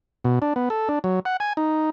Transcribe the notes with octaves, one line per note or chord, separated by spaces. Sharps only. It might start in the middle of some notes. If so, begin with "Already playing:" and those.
B2
D4
B3
A4
D4
F#3
F#5
G#5
D#4